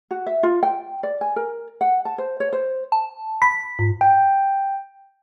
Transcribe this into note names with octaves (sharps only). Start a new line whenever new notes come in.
F#4
E5
F4
G5
D5
G#5
A#4
F#5
A5
C5
C#5
C5
A5
B5 B6
G#2
G5